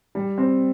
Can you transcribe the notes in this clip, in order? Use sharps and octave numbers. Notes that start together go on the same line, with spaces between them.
G3
C4